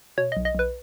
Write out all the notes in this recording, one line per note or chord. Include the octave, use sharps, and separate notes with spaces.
B2 C#5
D#5
B1
D#5
B1 B4